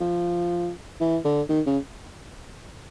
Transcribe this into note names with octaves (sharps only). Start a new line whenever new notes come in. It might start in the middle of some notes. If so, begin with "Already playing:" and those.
F3
E3
D3
D#3
C#3